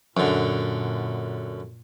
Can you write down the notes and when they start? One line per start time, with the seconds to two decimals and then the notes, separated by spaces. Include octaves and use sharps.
0.17 F#2 A#2 D3